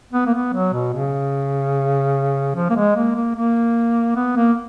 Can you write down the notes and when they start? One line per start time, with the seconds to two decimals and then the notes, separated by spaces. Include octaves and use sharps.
0.13 B3
0.26 A#3
0.34 B3
0.53 F#3
0.73 B2
0.94 C#3
2.55 F3
2.70 A#3
2.75 G#3
2.96 A#3
3.15 A#3
3.35 A#3
4.16 B3
4.36 A#3